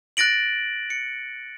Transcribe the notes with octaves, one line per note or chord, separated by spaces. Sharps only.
F#6 A6 A#6 D7 F#7
C#7